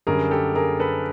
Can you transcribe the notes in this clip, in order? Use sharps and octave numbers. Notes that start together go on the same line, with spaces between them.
F#2 D3 G3 G#4 A#4
G4 A4
G#4 A#4
A4 B4